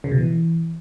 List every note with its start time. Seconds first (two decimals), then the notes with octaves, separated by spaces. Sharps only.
0.04 C#3
0.11 B2
0.18 E3